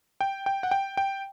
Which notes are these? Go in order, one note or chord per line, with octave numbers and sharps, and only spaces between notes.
G5
G5
F#5
G5
G5